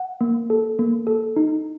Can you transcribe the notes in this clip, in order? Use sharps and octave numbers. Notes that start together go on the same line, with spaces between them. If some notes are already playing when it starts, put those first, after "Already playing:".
Already playing: F#5
A#3
A4
A#3
A4
D#4